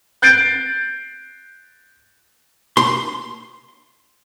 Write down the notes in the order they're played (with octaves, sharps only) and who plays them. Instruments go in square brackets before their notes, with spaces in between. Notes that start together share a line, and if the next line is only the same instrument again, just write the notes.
[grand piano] F#6 G6 A6 C7 D7
[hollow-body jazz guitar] C6